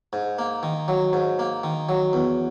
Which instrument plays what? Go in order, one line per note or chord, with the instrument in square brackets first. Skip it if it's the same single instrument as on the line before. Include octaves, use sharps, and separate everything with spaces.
[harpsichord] G#2
A#3
D#3
F#3
G#2
A#3
D#3
F#3
E2